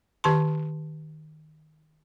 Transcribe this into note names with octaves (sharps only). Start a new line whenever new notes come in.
D#3 G4 A5 C6